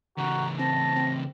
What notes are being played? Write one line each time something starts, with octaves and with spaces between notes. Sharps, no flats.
E2 C#3 F#4 A#5
C4 A5 A#6
C4